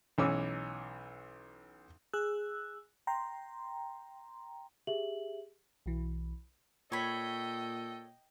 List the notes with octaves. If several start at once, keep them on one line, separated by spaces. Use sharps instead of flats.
B1 E3 C#4 D6 E6
G#4 E6 F#6
G5 A#5 C6
G4 G#4 E5 F#7
B1 E3
A#2 A4 C#5 D#5 G5 B5